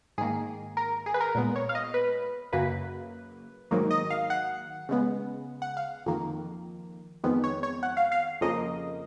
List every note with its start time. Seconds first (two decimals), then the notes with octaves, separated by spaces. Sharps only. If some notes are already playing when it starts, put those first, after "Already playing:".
0.18 G#2 D#3 A#3 G#4
0.77 A#4
1.06 G#4
1.14 B4
1.21 A#4
1.35 A#2 G#3 B3
1.56 C#5
1.69 F5
1.75 D#5
1.94 B4
2.53 F#2 C#3 F#3 A#3 B4
3.71 G#2 D#3 F#3 A#3
3.91 D#5
4.10 F5
4.30 F#5
4.89 C#3 G#3 B3
5.62 F#5
5.77 F5
6.06 F2 D#3 A#3
7.24 F2 D#3 G#3 B3
7.44 C#5
7.63 C#5
7.83 F#5
7.97 F5
8.12 F5
8.41 F2 C#3 F3 A#3 D#5